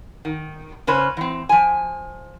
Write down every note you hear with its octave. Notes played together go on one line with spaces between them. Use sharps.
D#3
C#3 C#4 B4 C5
E3 C4
F3 G#5